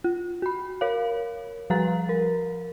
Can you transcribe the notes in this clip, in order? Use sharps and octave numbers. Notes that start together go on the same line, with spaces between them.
F4
F#4 B5
A#4 C#5 F5
F3 G3 B4 F5 A#5 A6
A#4